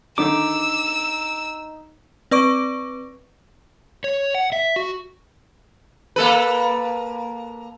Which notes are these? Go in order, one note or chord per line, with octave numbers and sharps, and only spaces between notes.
D3 D#3 A3 D#4 D6 E6
C4 B4 D5 C#6 D6 D7
C#5
F#5
E5
F#4
A#3 A4 B4